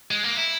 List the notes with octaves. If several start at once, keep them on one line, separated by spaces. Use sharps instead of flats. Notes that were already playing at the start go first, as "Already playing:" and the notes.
G#3
A#3
E4